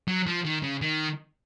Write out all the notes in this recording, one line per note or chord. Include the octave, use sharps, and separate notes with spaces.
F#3
F3
D#3
C#3
D#3